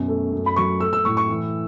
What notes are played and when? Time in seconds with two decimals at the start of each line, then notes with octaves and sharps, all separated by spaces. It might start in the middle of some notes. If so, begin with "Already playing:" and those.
Already playing: F#2 B2
0.08 A3
0.32 F#2
0.46 B5
0.56 F#3 C#6
0.80 A3 E6
0.93 E6
1.05 A2 C#6
1.17 C#6
1.28 E3